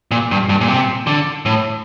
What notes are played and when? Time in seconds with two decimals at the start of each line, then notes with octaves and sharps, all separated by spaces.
0.11 A#2
0.31 G2
0.49 G2
0.61 A#2
0.68 C3
1.07 D3
1.46 A2